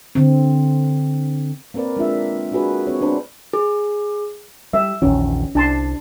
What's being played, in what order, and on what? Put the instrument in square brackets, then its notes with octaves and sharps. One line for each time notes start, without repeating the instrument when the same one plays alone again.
[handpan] D3 C4
A#3 C4 A#4 B4 D5
G#3 D4 F4 E5
A#3 D4 F#4 G#4 B4
C4 C#5
B3 D4 B4 C5
[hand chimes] G#4
[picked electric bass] G3 [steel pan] E5
[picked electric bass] A#1 E2 D#3 [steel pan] C#4
[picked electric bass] C2 [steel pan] D4 A5 C6